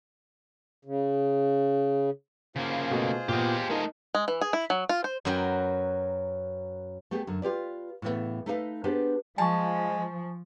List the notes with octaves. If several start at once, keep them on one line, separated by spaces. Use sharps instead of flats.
C#3
C#3 A#3 F4 G#4 C5
B2 A3
A#2 B3 G4 D#5
A3 D#4 A#4 D#5
G#3
E3
G#4
E4
F#3
F4
C5
F#2 F#3 F#4 A#4 B4 G5
A3 B3 G4 G#4
F#2 D3
F4 G4 B4 D5
A2 C#3 E3 G3 A3 B3
A3 D#4 A4 B4 D#5 F5
B3 D4 G4 G#4 B4 C5
F3 G#3 G#5 A5 C#6